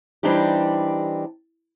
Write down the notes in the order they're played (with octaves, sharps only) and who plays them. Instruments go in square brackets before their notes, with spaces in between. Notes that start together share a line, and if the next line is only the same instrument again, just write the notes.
[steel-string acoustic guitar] E3 G3 C4 D4 D#4 G4